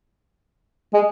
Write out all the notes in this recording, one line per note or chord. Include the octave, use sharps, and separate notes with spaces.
G#3